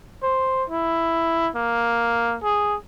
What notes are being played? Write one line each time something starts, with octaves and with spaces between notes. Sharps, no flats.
C5
E4
A#3
G#4